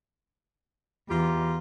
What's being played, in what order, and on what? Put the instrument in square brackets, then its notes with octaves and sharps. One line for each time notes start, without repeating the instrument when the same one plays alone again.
[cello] E2 [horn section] F4 G4 A#5